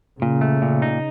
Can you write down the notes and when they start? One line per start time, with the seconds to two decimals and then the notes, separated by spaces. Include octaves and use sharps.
0.22 A#2 C#3
0.41 A3
0.62 A#2
0.82 D#4